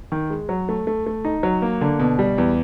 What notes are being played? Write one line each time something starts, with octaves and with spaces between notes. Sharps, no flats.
D#3
G#3
F#3
A3
A3
A3
D#4
F#3
A#3
D3
B2
G3
E2